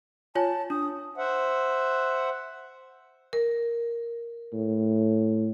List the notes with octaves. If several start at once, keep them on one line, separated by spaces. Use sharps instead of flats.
F4 C#5 G#5 A5
D4 D#6
C5 E5 F#5
A#4
A2